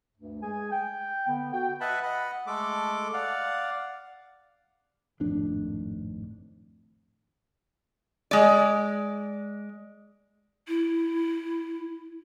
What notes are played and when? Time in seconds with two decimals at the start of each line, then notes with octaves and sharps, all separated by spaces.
0.16 D2 G2
0.42 G#3 G#4 G#5
0.72 G5
1.27 D3 B3
1.53 F#4 G5
1.81 B4 D#5 E5 F#5 A5 B5
2.03 D#5 F#5 B5
2.47 G#3 A3 A4 D6
3.14 D5 F5 F#5
5.20 G#1 F2 A2 D4
8.31 G#3 D5
10.68 E4